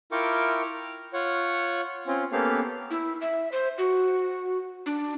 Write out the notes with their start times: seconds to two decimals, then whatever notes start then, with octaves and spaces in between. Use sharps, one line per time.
0.12 E4 F4 A#4 G5 C#6 D6
0.62 F6
1.13 F4 C#5 F#5
2.07 C4 C#4 F4
2.32 A#3 B3 C#4 G4 A4 F5
2.91 E4
3.21 E5
3.52 C5
3.78 F#4
4.86 D4